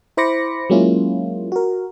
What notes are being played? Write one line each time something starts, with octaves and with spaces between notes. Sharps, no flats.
E4 C5 B5 D6 A#6 C#7
F#3 G#3 A#3 C#4 E4 F4
F#4 A#4